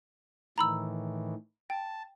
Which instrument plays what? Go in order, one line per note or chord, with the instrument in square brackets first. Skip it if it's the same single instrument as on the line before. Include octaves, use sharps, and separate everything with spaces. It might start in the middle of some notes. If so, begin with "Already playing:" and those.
[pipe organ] A2 D#3 E3 [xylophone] A#5 B5 E6
[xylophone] G5 [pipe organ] A5